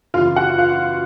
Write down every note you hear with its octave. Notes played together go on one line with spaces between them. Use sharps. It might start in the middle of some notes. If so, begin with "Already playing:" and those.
F#1 E2 C#3 E3 F4 F5
F#4 F#5
F4 F5